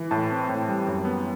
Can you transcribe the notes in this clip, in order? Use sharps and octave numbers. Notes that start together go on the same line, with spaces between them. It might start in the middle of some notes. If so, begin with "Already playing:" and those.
Already playing: E3
A2 A5
C4
A2
G3
F#2
B3